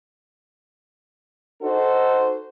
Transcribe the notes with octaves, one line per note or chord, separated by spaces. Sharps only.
D#4 F#4 A4 C5